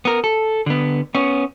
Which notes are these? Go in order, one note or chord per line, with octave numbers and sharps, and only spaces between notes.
B3 A#4
A4
D3 B3
B3 C#4